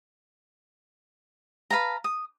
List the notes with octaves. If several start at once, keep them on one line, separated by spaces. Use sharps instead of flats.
B4 F5 A5 A#5
D#6